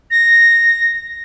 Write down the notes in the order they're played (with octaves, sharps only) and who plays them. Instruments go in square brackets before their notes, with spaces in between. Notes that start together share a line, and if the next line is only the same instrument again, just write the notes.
[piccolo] A#6